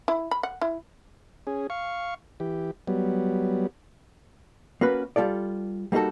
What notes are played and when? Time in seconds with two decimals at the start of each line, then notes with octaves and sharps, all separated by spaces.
0.08 E4
0.31 B5
0.43 F#5
0.62 E4
1.47 C#4 G#4
1.70 F5 C#6
2.40 E3 G4
2.87 F#3 G3 B3
4.81 A#3 C#4 F#4 B4
5.16 G3 F4 A4 D5
5.92 G3 A#3 D#4 F#4 A4